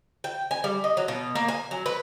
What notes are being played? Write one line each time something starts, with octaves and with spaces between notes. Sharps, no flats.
G5
G#5
G3
D#5
F#3
B2
A#3
G#5
F#3
B4